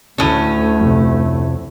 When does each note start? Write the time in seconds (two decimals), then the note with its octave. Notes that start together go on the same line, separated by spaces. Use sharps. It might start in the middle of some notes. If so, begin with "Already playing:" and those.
0.18 D2 A2 A3 C#4
0.81 F2 C3